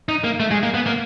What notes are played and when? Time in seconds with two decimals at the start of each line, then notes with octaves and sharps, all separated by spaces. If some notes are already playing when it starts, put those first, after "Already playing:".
0.09 D#4
0.24 A#3
0.40 A3
0.51 G#3
0.63 A#3
0.74 B3
0.86 A#3